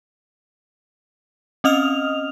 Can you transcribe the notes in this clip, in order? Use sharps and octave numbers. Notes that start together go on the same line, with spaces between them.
C4 C#4 D#5 D#6 F6 F7